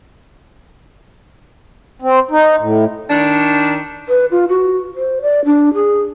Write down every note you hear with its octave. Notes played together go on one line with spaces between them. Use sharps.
C4
D#4
A2
D#3 D4
B4
F4
F#4
C5
D5
D4
G#4